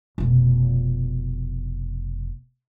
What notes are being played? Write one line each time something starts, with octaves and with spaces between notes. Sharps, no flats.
F1 B2